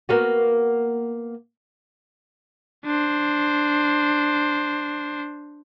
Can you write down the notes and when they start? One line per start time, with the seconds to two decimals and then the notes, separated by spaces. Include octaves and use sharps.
0.09 A#3 B3 F#4
2.85 D4 C5